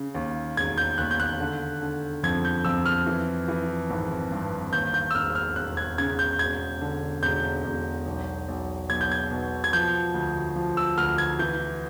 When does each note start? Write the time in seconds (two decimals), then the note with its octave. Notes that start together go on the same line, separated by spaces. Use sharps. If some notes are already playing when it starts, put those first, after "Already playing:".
Already playing: C#3
0.15 D#2
0.57 E1 G#6
0.78 G6
0.98 D#2 F#6
1.11 G6
1.20 F#6
1.40 D3
1.82 D3
2.23 F2 G#6
2.45 G6
2.65 F2 E6
2.86 F6
3.06 E3
3.48 E3
3.90 G#1
4.31 G2
4.73 D#2 G6
4.94 G6
5.11 E6
5.15 E1 F6
5.35 F6
5.56 E1 F#6
5.77 G#6
5.98 C#3 G#6
6.19 G6
6.39 E1 G#6
6.81 D3
7.23 E1 G6
7.64 E1
8.06 B1
8.48 B1
8.90 B1 G#6
9.01 G6
9.12 G#6
9.31 B2
9.64 G#6
9.73 F3 G6
10.14 D2
10.56 F3
10.77 E6
10.97 D2 F6
11.18 G#6
11.39 E3 G6